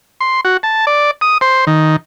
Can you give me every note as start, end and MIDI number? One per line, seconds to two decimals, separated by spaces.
0.21 0.41 84
0.45 0.57 66
0.63 0.85 81
0.87 1.11 74
1.21 1.38 87
1.41 1.65 72
1.67 1.96 51